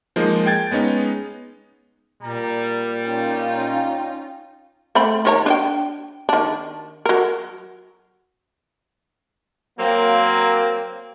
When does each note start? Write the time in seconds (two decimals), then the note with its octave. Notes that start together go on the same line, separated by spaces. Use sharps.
0.16 F3 G#3 A#3 D#4
0.46 G5 G#6 A6
0.71 G#3 B3 C#4 D#4
2.23 A#2 G3 A#5
3.06 C#4 D#4 F4 G5
4.95 A3 C4 B5
5.25 D#3 C#5 A#5
5.46 D4 E5 G5
6.29 D#3 D4
7.05 F#3 A#4
9.78 F#3 A#3 C4